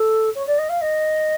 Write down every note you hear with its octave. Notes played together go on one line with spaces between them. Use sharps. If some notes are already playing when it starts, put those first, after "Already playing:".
Already playing: A4
C#5
D5
D#5
F5
D#5